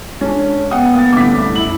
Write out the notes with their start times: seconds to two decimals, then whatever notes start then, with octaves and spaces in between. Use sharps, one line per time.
0.21 G#3 C#4 D4
0.71 B3 F#5 G5 D#6
0.95 A#3 F5 A6
1.13 C2 A2 D3 C4 C#4 D6 B6
1.55 F#2 E4 F#7